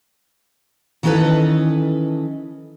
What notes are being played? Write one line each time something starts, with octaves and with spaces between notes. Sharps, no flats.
D#3 E3 C#4 A4 B4 D#5